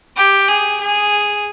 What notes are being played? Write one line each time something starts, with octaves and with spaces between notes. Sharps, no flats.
G4
G#4
G#4